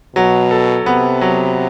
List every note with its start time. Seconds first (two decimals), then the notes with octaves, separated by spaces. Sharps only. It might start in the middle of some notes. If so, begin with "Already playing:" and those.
0.15 B2 F#3
0.51 A4
0.86 C3 B3
1.21 F#3